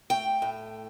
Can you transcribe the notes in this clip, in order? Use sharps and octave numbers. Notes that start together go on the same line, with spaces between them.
A3 G5
A2